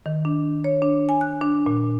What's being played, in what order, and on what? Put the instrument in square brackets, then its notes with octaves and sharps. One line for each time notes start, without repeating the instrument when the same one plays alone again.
[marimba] D#3
D4
C#5
D4
G#5
F#6
D4
A#2